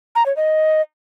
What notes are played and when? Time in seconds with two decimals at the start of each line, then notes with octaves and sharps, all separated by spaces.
0.15 A#5
0.26 C#5
0.36 D#5